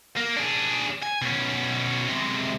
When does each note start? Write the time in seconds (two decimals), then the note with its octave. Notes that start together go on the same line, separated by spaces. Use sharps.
0.16 A#3
0.36 D4 G#4
1.02 G#5
1.22 B2 C#4
2.08 C3 G#3